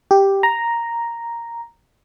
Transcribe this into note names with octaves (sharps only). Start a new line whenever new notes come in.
G4
A#5